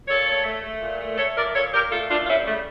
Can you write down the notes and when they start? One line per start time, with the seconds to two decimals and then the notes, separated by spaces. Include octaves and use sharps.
0.07 A#2 A4 C#5
0.26 A3
0.44 A3
0.62 A3
0.80 A#2
0.99 A3
1.17 A3 A4 C#5
1.36 A#2 A#4 D5
1.54 A#2 A4 C#5
1.72 A#2 G4 A#4
1.91 A3 F4 A4
2.09 A#2 D4 F4
2.23 F4
2.27 G3 C#4 E4
2.46 C#3 A3